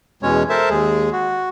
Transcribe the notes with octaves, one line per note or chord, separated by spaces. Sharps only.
E2 B2 G#3 C#4 C#5
A4 A#4 C5 E5 A5
D#2 G#3 G#4
F#4